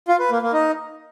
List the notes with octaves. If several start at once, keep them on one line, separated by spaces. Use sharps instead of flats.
F4
B4
A#3
A#3
D#4